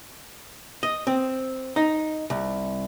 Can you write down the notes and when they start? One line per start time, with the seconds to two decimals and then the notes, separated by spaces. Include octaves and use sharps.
0.83 D#5
1.07 C4
1.76 D#4
2.30 C2